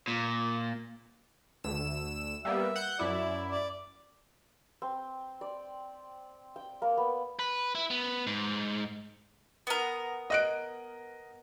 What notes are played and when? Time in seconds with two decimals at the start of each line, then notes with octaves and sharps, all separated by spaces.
0.08 A#2
1.64 D2 E6 E7
2.45 G3 A#3 B3 E5
2.76 F#5 G6
2.99 F#2 E4 D5
3.51 D5
4.82 C4
5.41 D5
6.56 G5
6.82 A#3
6.97 B3
7.39 B4
7.75 E4
7.90 B3
8.27 G#2
9.67 B3 A#4
10.30 D#5 F#6 D7